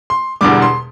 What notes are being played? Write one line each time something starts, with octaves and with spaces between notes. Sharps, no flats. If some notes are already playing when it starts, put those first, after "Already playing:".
C6
E1 E2 D3 G3 D6
C6